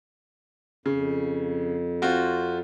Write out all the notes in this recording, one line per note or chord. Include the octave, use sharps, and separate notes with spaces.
F2 C#3
C4 F4 F#4